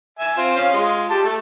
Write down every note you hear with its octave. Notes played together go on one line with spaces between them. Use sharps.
E5 G#5
C4 F4 C5
C#4 F5
G#3 F4
G4 A5
A3